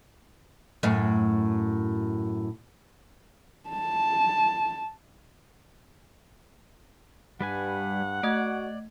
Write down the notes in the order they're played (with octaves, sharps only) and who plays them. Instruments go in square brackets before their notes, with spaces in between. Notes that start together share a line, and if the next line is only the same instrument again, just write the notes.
[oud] F#2 A2
[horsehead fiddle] A5
[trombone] G2 [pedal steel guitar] G3 B4 G#5 [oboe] F#5
[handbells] A3 D#5 G#6 [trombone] F#4 [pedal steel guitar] D5